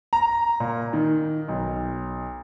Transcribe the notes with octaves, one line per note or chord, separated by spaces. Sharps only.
A#5
A#2
D#3
B1